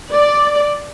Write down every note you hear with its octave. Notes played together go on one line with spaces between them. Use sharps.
D5